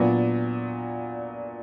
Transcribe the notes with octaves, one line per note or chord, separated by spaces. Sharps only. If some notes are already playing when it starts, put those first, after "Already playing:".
Already playing: A#2 F#3 B3 D4